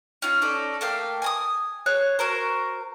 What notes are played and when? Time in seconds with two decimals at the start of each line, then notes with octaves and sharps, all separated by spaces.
0.22 C#4 D#4 F4
0.42 C#4 D#4 A4 D5
0.81 A3 A#3 F5 G5
1.22 G#5 A#5 D#6
1.86 G#4 C#5 F#6
2.19 F#4 A#4 C5